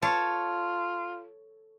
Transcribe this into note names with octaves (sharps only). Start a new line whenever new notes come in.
F4 A4 C#5 A5